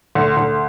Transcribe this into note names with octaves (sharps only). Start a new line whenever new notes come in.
D2
D2